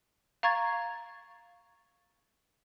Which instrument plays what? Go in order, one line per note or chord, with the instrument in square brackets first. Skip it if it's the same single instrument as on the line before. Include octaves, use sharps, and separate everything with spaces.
[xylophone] F5 A#5 C#6 G#6 A6